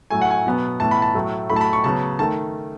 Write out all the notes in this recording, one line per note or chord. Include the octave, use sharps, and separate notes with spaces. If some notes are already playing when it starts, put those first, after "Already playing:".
A2 F#3 A3 G#5
F#5
G#5
B2 F#3 B3
A2 E3 B3 A5
B5
A5
A2 F#3 A3
A2 F#3 A3 B5
A5
B5
C#6
C#3 F#3 B3 A5
D#3 A3 A5